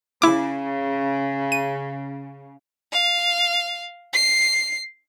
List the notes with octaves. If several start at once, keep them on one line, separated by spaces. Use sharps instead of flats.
C#3 E4 D6
D#7
F5
C7